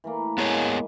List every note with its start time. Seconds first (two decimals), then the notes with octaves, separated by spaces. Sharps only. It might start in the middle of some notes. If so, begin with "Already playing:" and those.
0.04 E3 A3 A#3
0.38 G#3 B3 G#4 C#5